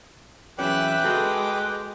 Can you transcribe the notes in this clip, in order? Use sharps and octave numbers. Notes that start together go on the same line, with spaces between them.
E2 F#3 C#4 B4 E5 G5 D6 F#6
G#3 F#4 A4